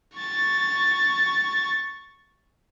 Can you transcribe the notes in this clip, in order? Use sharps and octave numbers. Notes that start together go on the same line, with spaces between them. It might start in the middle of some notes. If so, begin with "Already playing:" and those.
C#6 A6